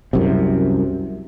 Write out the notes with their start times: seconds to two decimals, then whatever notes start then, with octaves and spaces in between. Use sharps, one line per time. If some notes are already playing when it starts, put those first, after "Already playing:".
0.13 C2 F#2 C3